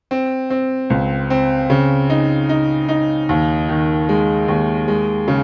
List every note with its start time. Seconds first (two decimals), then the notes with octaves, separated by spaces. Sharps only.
0.11 C4
0.50 C4
0.90 C#2
1.30 C4
1.70 C#3
2.10 D#4
2.49 D#4
2.88 D#4
3.29 D#2
3.69 D#3
4.09 G#3
4.48 D#2
4.88 G#3
5.28 C#3